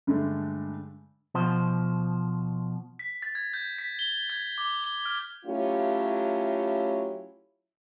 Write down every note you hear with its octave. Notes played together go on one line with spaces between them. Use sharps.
G2 D3 G#3 A3
B2 F3 C5
B6
A6
G#6
G6
B6
G7
G#6
D6
G7
F6
F#3 A3 C#4 E4 F4 G4